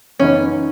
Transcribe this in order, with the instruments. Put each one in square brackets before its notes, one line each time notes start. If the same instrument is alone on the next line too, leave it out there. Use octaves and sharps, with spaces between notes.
[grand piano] F#2 E3 B3 D#4 [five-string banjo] C#4